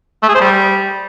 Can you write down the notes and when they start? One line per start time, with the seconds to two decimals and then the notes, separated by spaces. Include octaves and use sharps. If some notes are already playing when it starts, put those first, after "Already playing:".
0.23 A3
0.29 G#4
0.35 C5
0.41 G3